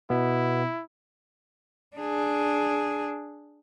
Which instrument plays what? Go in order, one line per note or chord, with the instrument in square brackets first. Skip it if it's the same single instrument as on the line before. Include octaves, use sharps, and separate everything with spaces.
[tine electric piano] B2 B3 [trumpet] E4
[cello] D4 G#4